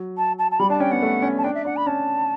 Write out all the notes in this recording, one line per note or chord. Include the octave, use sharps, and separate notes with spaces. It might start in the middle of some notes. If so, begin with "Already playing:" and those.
Already playing: F#3
A5
A5
A5
G3 B5
D4 A5
C#4 G5
B3 F#5
A3
C#4
A5
D4 G5
E5
D4 F#5
B5
C#4 A5